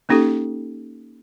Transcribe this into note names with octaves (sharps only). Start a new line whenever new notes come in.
A#3 C#4 D#4 G4 A4